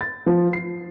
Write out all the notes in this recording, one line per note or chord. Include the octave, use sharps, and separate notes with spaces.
A6
F3
C7